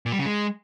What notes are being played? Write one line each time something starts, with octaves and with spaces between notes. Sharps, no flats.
A#2
G3
C#3
G#3